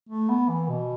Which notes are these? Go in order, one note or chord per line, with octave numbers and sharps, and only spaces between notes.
A3
B3
E3
B2